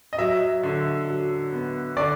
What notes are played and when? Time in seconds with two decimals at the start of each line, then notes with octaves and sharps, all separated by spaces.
0.13 D#5
0.18 F#3 E5
0.63 D3
1.07 F#3
1.52 B3
1.97 D3 D5